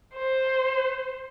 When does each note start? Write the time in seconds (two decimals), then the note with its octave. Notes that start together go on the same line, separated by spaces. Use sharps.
0.14 C5